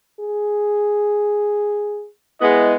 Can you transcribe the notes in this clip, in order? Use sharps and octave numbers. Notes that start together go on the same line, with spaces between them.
G#4
G#3 B3 E4 D#5